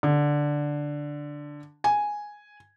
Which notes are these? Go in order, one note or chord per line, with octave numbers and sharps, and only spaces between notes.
D3
G#5